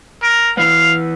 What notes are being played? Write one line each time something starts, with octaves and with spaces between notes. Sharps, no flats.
A#4
E3 B3 F5